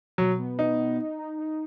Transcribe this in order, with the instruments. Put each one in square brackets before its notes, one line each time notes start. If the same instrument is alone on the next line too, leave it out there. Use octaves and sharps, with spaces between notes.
[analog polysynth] B2 [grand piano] F#3
[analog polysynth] B3
[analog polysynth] B2 [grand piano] D#4
[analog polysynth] B2
D#4
D#4
D#4